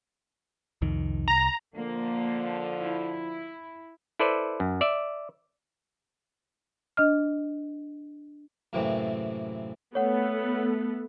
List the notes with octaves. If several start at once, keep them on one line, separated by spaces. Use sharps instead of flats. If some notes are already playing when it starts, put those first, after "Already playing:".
C2 F2 D#3
C2 A#5
D3 F3 A#3
E4
E4 A4 B4 C5 D5
F#2
D5 E5
D4 D#5 F6
F#2 A2 C3 E3 A#3 C4
A3 B3 A4 C#5 F#5